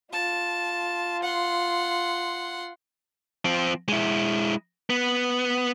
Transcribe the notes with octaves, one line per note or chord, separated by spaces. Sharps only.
F4 A5
F#5 C6
F3 C4
G#3 E4
B3